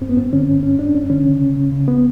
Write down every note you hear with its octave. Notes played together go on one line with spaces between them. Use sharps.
G2 C4
B3
G2 C4
D3 C#4
G2
G2 C#4
G2 D4
G2 C#4
D3 C#4
C#3
C#3
C#3
C#3
B3